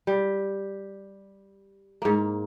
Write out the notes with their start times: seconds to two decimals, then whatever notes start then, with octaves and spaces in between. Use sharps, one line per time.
0.07 G3
2.02 G#2 A#3